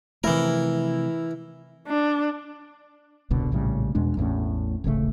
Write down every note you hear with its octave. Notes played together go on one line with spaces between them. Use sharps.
C3 E3 F3 A3 E4 A#4
D4
E1 C2 B2 D3
A#1 A2 C#3 G3
E2 B2 G#3 D4
A1 E2 A2 C#4
D1 G#1 C#3 A3